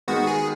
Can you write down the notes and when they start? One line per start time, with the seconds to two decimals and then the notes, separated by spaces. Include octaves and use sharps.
0.08 D#3 G#3 B3 D#4 F#4
0.27 G#4